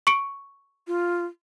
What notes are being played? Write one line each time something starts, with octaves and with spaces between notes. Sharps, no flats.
C#6 C#7 D7
F4